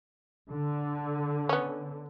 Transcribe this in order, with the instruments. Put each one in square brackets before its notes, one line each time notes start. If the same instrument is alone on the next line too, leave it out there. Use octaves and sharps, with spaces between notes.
[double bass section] D3
[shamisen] B3 C#4